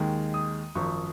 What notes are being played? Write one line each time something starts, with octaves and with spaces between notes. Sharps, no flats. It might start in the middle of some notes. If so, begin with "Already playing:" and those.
Already playing: D#2 D#3 G#3
D#6
G#1 F#2 F3 C#6